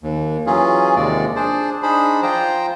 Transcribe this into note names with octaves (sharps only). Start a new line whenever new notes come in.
D#2
E3 F#3 C#4 F4 G#4
D#2 C3 F3 G#3 D5
D4 G#4 C5 D5
D4 D#4 G#4 C5 B5
F3 F4 C5 G5 A#5